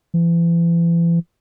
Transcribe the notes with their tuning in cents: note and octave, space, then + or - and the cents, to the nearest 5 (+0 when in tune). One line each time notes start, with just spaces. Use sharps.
E3 +40